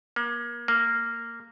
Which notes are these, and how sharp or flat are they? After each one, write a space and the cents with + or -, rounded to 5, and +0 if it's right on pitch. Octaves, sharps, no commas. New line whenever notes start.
A#3 +30
A#3 -15